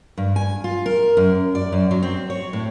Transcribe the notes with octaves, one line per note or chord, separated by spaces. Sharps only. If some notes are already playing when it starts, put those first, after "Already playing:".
G2
G#5
F4
A#4
F#2
D5
F#2
F#3
C4
C#5
A2